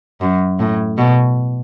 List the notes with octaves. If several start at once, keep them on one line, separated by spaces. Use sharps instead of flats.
F#2
A2
B2